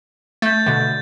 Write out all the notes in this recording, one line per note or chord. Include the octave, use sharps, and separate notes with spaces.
A3 G6 A6
B2 D3